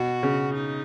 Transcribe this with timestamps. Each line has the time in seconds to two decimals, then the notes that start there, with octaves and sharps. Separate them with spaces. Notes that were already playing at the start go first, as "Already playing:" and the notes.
Already playing: B2 F#4
0.23 C#3
0.54 D#4